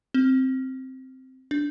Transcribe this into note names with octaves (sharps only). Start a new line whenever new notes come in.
C4
D4